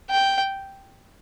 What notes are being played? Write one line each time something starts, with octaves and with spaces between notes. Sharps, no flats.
G5